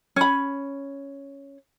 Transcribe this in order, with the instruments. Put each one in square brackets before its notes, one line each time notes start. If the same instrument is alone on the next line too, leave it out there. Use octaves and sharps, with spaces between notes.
[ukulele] C#4 B5